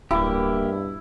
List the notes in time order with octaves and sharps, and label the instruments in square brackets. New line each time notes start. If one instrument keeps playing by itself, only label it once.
[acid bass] D1 [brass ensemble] G2 B2 [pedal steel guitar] A#3 G4 [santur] E4